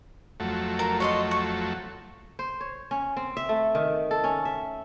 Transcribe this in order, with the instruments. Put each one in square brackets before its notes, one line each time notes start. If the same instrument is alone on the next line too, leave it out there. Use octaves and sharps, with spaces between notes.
[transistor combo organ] F2 F#3 A3
[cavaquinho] A#4
C#5 D#5 C6
C#6
[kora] C5
C#5
C#4
C4
E5
A3
D#3
A4
C#4
E5